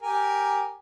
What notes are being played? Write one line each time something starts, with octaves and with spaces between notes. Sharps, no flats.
G4 A#4 G#5